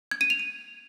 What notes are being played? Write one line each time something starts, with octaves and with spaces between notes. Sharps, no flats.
G#6
D#7
F7
D#7